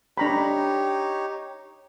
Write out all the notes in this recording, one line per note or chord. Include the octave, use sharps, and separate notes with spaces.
D4 D#4 G4 C#5 A#5 B5